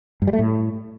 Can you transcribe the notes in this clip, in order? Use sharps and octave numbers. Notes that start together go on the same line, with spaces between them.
G2
G3
A3
A2